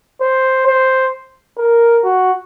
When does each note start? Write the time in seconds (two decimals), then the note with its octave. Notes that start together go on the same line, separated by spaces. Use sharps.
0.21 C5
0.67 C5
1.58 A#4
2.04 F#4